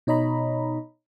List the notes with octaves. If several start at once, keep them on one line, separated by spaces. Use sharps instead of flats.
B2 D#4 C#5 D#5 A#5 B5